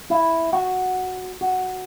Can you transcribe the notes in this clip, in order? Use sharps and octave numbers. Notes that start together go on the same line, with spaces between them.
E4
F#4
F#4